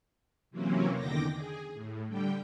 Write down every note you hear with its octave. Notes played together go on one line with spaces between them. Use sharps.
C3 E3 F#3 A#3 C4 C#4
E2 D3 D#3 G5 D6 A#6
G#4
A2
D3 G3 G5